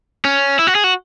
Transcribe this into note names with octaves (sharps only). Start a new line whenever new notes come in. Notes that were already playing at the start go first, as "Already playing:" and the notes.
C#4
E4
F#4
G#4
F#4